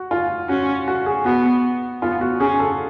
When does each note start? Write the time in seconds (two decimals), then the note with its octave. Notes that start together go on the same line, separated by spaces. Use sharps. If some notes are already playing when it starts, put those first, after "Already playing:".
Already playing: F#4
0.11 F4
0.49 C#4 F#4
0.88 F#4
1.06 G#4
1.25 B3 F#4
2.02 B3 F4
2.21 F#4
2.40 C#4 G#4
2.59 A4